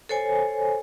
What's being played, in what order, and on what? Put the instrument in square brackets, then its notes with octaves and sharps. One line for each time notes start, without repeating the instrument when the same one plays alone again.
[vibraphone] A4 C5 C#5 G#5